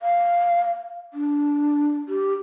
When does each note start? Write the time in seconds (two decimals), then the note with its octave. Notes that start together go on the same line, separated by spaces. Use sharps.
0.02 F5
1.14 D4
2.09 G4